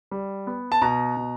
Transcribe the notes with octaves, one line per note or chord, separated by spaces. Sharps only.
G3
B3
A5
B2 A#5
B2